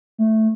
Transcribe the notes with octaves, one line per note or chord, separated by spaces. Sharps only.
A3